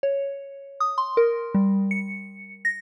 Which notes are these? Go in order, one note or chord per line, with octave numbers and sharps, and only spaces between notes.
C#5
D#6
C6
A#4
G3
C#7
A#6